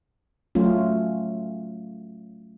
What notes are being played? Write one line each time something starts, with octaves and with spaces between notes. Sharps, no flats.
F#3 A3 C#4 F4